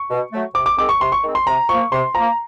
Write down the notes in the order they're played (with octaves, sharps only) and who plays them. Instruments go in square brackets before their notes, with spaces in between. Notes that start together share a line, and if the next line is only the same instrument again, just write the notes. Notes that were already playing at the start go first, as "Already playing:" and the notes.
Already playing: [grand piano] C#6
[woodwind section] B2
F#3 A3
[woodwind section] C3 [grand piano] D6
[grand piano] D6
[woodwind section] D#3 G#3 C4 [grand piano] D6
[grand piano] C#6
[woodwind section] C3 [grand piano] C6
[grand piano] C#6
[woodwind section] D#3 G#3 C4
[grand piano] C6
[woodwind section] C3 [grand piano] A#5
[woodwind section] F3 A#3 [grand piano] C#6
[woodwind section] C3 [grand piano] C6
[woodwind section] F3 A#3 [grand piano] A#5